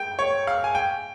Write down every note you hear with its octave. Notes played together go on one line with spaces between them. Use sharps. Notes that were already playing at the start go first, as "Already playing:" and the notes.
Already playing: G5
C#5
F5
G#5
G5